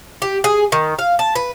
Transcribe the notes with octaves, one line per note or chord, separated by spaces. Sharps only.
G4
G#4
D#3
F5
A5
B4